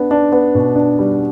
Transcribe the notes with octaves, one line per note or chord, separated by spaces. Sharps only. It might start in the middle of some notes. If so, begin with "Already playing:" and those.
Already playing: B3 D4
D4
B3
B2
D4
G3